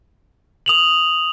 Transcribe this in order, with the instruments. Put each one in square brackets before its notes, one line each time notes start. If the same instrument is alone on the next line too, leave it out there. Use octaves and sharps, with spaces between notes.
[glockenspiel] D#6 F7 F#7